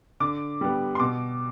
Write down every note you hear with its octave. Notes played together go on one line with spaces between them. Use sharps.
D3 D6
G3 B3
C6
B2 D6